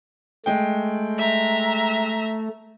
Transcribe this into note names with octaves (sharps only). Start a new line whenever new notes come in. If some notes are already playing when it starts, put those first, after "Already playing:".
G#3 A3 G5
E5 A#5